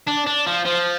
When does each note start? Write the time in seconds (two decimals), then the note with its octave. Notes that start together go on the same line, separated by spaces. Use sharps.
0.07 D4
0.26 D4
0.47 F3
0.66 F3